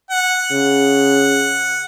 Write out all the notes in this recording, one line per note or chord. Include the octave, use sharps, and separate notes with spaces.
F#5
C#3